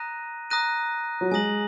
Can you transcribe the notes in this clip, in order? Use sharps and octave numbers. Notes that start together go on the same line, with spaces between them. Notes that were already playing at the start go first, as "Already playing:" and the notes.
Already playing: A#5 D#6 F#6 A#6 D#7
A#5 D#6 F#6 A#6 D#7
F#3
G#3 G#5 D#6 A#6 F#7